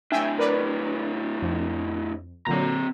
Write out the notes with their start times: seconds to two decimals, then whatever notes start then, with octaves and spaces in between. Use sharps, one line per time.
0.12 A2 D4 E5 G5 G#5
0.39 A#4 B4 D5
1.42 F2
2.47 A#2 D3 F#3 C4 A#5